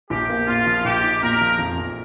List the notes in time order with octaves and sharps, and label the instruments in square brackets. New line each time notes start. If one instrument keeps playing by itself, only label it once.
[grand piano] A#1 [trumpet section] G4
[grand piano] A#3
[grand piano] A#2 [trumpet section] F4
[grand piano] F3
[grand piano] A#1 [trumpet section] G4
[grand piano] D#4
[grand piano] A#2 [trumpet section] A#4
[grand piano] F3
F2
F2